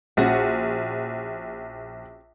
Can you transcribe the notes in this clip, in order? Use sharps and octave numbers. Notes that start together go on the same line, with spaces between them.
A#1 C#4 F#4 F#5